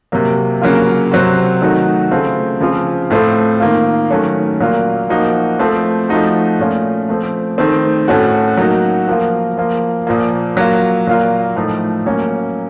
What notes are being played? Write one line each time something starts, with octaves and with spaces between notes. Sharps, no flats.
C3 F#3 A#3
C#3 F#3 A#3 F4
C3 F#3 C4 F#4
D#3 F#3 A3 D#4 F#4
C#3 A3 C4 F4
C#3 F3 C4 F4
A2 A3 C4 F4
D#3 A#3 F4
D#3 F#3 A3 C#4
A#2 F#3 A#3 F4
F3 A#3 D#4 F#4
F3 A3 C4
F3 A3 D#4 F#4
A#2 A3 C#4 F4
F3 A3 C4
D#3 A3 C4
A2 A3 C#4 F#4
F#3 A#3 D#4 F#4
F3 A#3 F4
F3 A#3 F4
A#2 F3 A#3
F#3 A#3 F4
A#2 F#3 A#3 F4
A2 F3 A3 D#4
F#3 A#3 C#4